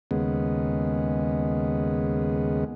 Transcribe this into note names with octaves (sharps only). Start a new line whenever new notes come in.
D#2 C#3 G#3 B3